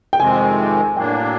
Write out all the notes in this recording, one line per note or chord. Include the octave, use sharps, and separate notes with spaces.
G5
F2 C3 D#3 G#3 C4 G#5
A2 F#3 A#3 D4 G5